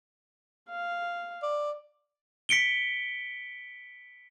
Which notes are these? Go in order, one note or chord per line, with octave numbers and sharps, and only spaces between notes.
F5
D5
B6 C#7 D7 G7